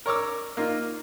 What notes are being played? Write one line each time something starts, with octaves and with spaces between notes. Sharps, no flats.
A#4 C#5 C#6 D6 E6
A#3 D#4 F4